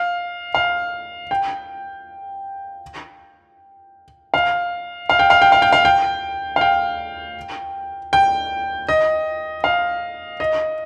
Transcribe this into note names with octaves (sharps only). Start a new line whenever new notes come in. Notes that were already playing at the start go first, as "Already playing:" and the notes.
Already playing: F5
F5
G5
F5
F5
G5
F5
G5
F5
G5
F5
G5
F5
G5
G5
D#5
F5
D#5